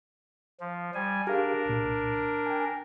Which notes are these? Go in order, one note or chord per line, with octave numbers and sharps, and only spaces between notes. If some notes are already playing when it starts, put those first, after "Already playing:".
F3
G3 G#5
D4 G4 G#4 A#4 F5
C2 A#2
G5 G#5